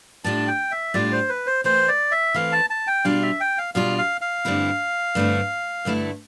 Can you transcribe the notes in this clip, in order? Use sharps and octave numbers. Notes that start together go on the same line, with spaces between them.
A2 G3 D4 F4 A5
G5
E5
A2 G3 D4 F4 D5
C5
B4
C5
E3 A3 C4 C5
D5
E5
E3 A3 C4 F5
A5
A5
G5
B2 G3 D4 F4 F5
E5
G5
F5
B2 G3 D4 F4 F5
F5
F5
G2 D3 A3 C4 E4
G2 D3 A3 C4 E4
G2 D3 A3 E4 A4